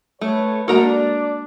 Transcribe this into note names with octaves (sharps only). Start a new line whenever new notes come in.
A3 A4 B4 C#5
G#3 A#3 D4 F#4 A4 A#4 D5 A#5